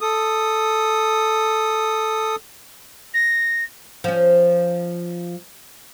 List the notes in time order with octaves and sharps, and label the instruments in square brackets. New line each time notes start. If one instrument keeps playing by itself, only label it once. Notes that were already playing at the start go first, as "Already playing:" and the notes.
[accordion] A4 D#6
[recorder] A#6
[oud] F3 C#4